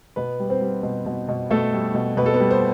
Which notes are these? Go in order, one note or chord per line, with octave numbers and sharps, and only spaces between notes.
B2 B3 B4
G3
C4 C5
G3
B2
B2
B2
B2 A3 A4
G3
B2
B2 B4
A4
B3 B4
G3
C5